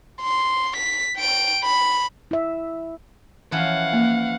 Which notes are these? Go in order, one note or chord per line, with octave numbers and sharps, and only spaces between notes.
C6
B6
G5 D7
B5
E4 E5
E3 F3 C#4 F5 F#5
A#3